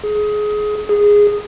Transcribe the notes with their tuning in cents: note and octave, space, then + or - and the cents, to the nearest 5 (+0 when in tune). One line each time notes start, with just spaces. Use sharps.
G#4 +20
G#4 -10